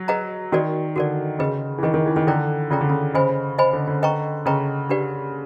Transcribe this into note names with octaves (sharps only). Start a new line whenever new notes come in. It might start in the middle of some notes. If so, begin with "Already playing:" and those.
Already playing: F#3
G#4 B4 D#5 F#5 A#5
D#3 F#4 A#4 D5
D3 F#4 A#4 D5
C#3 G#4 B4 D#5
E3
D#3 G#4 B4 D#5
D#3
E3
D#3
D3 F4 A4 D5 G5 A#5
C#3 F4 A4 D5 G5 A#5
D3
C#3
C#3 C5 D#5 G#5 B5
C5 D#5 G#5 B5
D3
D3
B4 D#5 G5 A#5 C#6
C#3 B4 D#5 G5 A#5 C#6
D4 G4 B4 D5 F#5